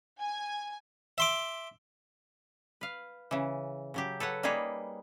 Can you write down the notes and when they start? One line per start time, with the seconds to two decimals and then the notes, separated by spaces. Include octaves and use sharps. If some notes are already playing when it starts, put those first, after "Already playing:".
0.21 G#5
1.18 E5 C6 D6
2.81 B4 F5
3.31 C#3 E3
3.94 C#3 F#3 G4
4.20 A4 B4 C#5 F#5
4.43 G3 A#3 D#4 G#4 B4 C#5